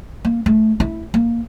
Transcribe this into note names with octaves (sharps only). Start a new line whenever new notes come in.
A#3
A3
E4
A#3